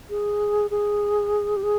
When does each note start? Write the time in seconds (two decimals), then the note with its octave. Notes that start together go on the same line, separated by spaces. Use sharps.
0.10 G#4
0.71 G#4
1.57 G4
1.63 G#4